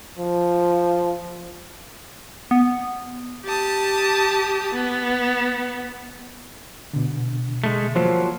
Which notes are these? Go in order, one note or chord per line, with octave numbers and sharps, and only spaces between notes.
F3
B3
G4 A5 D#6
B3
B2 D3
G#3 A3
F3 F#3 A#3 C5